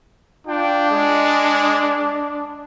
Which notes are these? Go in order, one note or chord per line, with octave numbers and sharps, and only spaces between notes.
D4 F4 G5
G#3